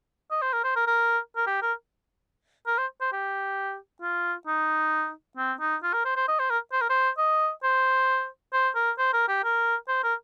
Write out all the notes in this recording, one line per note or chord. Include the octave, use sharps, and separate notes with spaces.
D#5
C5
A#4
C5
A#4
A#4
A#4
G4
A#4
A#4
C5
C5
G4
F4
D#4
C4
D#4
F4
A#4
C5
C5
D#5
C5
A#4
C5
A#4
C5
D#5
C5
C5
A#4
C5
A#4
G4
A#4
C5
A#4